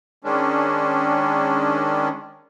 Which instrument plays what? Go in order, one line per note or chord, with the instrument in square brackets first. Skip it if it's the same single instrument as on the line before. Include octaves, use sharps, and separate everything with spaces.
[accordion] D#3 G#3 C#4 D4